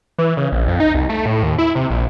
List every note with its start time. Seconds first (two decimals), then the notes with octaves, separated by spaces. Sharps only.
0.18 E3
0.37 C#3
0.52 A#1
0.68 F2
0.80 D#4
0.95 C2
1.09 A3
1.26 A2
1.43 D#2
1.58 E4
1.75 C3
1.90 A#1